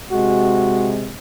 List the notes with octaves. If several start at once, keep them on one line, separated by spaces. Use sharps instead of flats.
C3 G#3 F#4